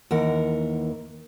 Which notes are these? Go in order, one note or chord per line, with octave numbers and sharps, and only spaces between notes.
D#2 E3 A#4 F#5